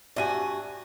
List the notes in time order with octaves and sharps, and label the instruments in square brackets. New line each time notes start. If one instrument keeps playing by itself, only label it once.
[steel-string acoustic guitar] G2 F#4 G#5 [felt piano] D5 E5 D#7